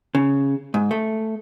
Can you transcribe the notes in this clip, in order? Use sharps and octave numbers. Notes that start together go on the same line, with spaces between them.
C#3
G#2
A3